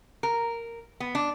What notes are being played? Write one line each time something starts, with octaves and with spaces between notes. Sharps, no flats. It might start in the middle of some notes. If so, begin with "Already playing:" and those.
A#4
B3
D4